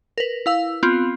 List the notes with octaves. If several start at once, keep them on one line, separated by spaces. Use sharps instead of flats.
A#4 B4
E4 F5 E6
B3 C4 F4